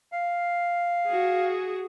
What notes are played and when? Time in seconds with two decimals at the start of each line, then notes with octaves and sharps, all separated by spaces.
0.12 F5
1.07 F#4 G#4